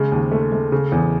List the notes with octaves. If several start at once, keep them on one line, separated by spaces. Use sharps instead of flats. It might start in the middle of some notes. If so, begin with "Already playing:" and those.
Already playing: C#3 G#3
D#2
A3
A3
C#3
E2